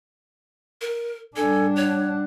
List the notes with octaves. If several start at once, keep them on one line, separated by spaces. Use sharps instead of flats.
A#4
G3 D4 A4 G#5
C#5 F#5